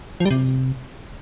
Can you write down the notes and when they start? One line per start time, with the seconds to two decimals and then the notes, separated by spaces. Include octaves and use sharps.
0.20 F3
0.25 G3
0.31 C3